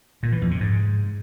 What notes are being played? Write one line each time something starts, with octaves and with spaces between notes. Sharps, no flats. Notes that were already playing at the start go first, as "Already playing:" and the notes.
A#2
E3
F2
C3
G#2